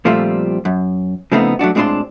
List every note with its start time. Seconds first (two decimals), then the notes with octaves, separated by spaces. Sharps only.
0.05 A#2 F3 G3 A3 C4 F4
0.65 F#2
1.32 C#3 F3 A3 B3 C4 D#4
1.59 F#3 A3 D4 F#4
1.75 A2 G#3 C4 D4 F4 C6